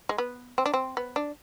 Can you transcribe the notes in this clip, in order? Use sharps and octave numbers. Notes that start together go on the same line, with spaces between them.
G#3
B3
C4
D4
C4
B3
D4